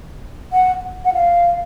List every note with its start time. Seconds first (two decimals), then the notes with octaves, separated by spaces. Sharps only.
0.53 F#5
1.05 F#5
1.13 F5